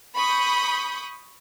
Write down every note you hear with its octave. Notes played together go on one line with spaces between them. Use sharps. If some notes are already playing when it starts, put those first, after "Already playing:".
B5 C#6 D#6 G6